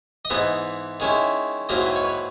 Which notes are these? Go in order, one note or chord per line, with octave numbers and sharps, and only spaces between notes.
D#5
G#2 E3 B3 D#4 E5
D#3 G#3 C#4 E4
G#2 D#3 F#3 A#3 E4 D#5
B4
C#5
B4